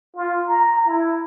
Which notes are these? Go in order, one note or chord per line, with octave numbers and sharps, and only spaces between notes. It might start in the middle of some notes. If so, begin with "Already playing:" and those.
F4
A#5
E4